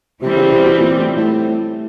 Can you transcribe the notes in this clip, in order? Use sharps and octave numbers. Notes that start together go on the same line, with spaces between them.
C3 E3 G3 C4
C#3
C3
B2
A#2
A2
A2